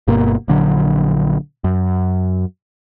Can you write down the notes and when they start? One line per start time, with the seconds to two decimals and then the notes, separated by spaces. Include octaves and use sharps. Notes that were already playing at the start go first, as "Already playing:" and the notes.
0.07 G1 G2 B2 A#3
0.48 A#1 D3 F#3
1.64 F#2